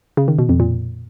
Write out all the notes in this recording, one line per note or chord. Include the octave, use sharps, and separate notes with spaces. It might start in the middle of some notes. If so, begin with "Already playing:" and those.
C#3
D#3
B2
F2
A#2